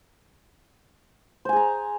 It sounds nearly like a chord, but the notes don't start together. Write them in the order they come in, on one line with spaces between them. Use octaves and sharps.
C5 G#5 G#4 A#5